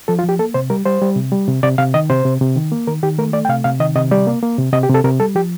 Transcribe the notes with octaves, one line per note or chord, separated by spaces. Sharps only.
F3 A4
F4
F3 G4
A#3 A4
C3 C5
G3 A#4
G3 C5
G3
C3
G3
C3
C3 D5
C3 F5
D#3 D#5
C3 C5
C3
C3
D#3
A#3
D#3 A#4
D#3 G4
A3 A#4
A3 D5
G5
C3 F5
C3 F5
D#3 D#5
C3 D#5
G3 D5
A#3
A#3
C3
C3 D#5
G4
C3
A4
C3 A#4
G3 A4
F3 G4